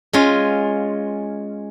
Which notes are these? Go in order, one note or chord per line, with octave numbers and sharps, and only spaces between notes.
G#3 C#4 F4